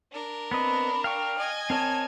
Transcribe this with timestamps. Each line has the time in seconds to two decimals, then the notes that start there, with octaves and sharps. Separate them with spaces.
0.11 D4 A#4
0.51 B3 C4 D#5 B5
1.04 F5 G5 C#6
1.38 D#5 G#5
1.70 C4 A#4 C#5 A5